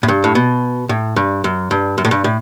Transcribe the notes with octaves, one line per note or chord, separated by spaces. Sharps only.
A2
G2
A2
B2
A2
G2
F#2
G2
F#2
A2
G2
A2